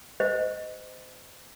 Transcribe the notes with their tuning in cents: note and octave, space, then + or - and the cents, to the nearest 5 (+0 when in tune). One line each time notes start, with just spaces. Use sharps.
C5 -30 D#5 +0